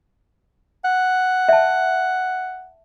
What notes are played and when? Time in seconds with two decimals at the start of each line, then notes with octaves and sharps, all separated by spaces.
0.84 F#5
1.49 E5 A5